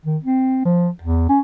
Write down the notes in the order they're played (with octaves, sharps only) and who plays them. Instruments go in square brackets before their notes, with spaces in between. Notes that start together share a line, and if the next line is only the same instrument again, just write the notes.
[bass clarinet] D#3
C4
F3
E2
C#4